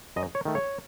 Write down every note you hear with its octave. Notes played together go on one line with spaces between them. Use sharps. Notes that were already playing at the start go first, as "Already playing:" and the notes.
F#2 D#5
C#5
D#3 A3
C#5